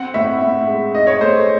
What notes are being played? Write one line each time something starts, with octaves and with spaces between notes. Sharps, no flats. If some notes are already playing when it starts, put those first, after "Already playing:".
Already playing: C4 F#5
A2 E5
A2
G#3
D#4 D#5
C#5
A3 C5